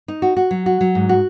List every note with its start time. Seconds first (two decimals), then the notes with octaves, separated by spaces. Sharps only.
0.08 D#4
0.22 F#4
0.37 F#4
0.51 F#3
0.66 F#4
0.81 F#3
0.95 G#2
1.09 F#4